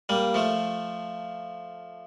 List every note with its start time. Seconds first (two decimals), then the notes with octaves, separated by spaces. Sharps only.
0.09 G3 A#3
0.34 F3 A3